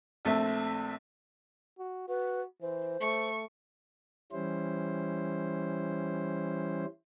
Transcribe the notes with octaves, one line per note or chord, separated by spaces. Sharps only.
A#1 A3 C4 E5
F#4
F#4 B4
E3 C5
A3 C#6
E3 G3 C#4 E4 C5